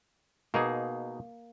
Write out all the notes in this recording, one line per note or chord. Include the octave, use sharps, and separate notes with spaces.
B2 A#3 D#4 G#4